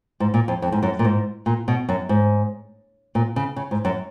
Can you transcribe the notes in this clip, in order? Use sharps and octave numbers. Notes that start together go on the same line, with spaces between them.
G#2
A#2
F2
F2
G#2
F#2
A#2
G#2
A#2
B2
F#2
G#2
A#2
C#3
C#3
G#2
F#2